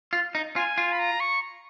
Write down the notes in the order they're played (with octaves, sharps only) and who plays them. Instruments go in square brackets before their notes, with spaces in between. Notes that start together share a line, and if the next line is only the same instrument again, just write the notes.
[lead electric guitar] F4
D#4
[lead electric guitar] F4 [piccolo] G#5
[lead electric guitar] F4
[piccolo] B5
A#5
C#6